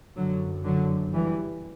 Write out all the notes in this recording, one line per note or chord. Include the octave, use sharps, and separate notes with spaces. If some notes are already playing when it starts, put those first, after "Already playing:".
F#1 F#2 D3 F#3
D3 F#3
E3 G3